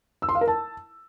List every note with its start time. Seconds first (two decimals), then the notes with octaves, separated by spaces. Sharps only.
0.22 E6
0.29 C6
0.35 F5
0.41 A#4
0.48 A5